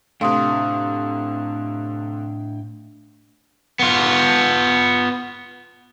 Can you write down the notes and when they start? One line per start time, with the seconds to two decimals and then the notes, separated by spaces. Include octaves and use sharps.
0.21 A2 C3 A3 D4 F5 G5 C6 D#6
3.79 B3 F4